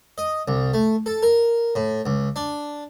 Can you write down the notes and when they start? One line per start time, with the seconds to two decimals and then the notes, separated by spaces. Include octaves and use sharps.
0.18 D#5
0.48 C2
0.74 A3
1.06 A4
1.23 A#4
1.75 A2
2.06 C#2
2.36 D4